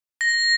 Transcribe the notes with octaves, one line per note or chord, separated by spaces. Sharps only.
A#6